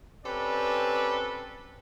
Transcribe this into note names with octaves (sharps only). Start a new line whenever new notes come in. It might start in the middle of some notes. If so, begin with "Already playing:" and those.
C4 C#4 G4 A4 B4 D5